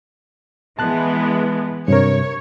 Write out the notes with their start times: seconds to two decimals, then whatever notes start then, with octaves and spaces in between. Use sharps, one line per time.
0.79 E3 G#3 B3 A5 F#6
1.88 G2 C3 A#4 C#5